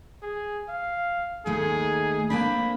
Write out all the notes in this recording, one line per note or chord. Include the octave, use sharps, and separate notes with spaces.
G#4
F5
D#2 A3 D#4 G#4
A#3 C4 D4 B5